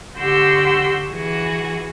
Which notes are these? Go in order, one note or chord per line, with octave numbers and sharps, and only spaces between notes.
D3 F#4 G4 C6 E6 G6
E3 F#4 G#4